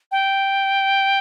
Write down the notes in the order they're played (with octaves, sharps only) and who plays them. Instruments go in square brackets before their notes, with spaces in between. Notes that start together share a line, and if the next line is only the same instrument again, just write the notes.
[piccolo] G5